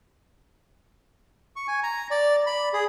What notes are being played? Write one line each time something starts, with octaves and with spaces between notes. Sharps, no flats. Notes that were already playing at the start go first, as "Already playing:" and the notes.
C#6
G#5
A#5
D5
B5
G#4